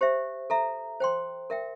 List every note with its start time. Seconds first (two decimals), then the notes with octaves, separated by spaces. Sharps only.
0.01 G4 C5 E5
0.50 A4 E5 A#5
1.00 C5 G5 C6
1.50 A#4 E5 G5